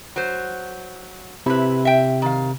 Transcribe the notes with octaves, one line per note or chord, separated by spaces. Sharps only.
F#3 C5
C3 E4 B4
E5 G5
D#3 F5